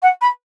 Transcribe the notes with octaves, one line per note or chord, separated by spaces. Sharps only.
F#5
B5